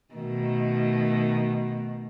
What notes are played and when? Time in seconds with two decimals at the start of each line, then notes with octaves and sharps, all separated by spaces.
0.14 B2 D#3 A3